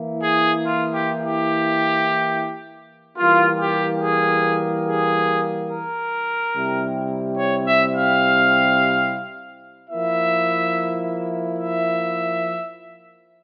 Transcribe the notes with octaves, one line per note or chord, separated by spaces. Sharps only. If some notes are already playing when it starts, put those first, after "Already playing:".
Already playing: E3 A#3 E4
G#4
F4
G4
G4
E3 G3 A#3 F4
G4
G#4
G#4
A#4
C3 G3 C4 E4
C#5
E5
F5
F3 A#3 E4 E5
E5